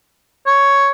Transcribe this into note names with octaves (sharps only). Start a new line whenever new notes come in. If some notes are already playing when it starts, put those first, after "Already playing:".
C#5